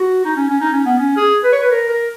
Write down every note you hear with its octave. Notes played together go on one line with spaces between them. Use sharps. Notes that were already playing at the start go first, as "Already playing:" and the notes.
Already playing: F#4
D#4
C#4
C#4
D#4
C#4
B3
C#4
G#4
B4
C#5
B4
A#4
A#4